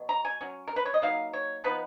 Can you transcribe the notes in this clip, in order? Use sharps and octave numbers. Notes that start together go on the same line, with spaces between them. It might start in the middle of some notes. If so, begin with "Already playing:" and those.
Already playing: B2 F#3
A#5
G#5
F#3 C#4
A#4
B4
C#5
D#5
F#3 A#3 D#4 F5
C#5
F3 B3 D#4 B4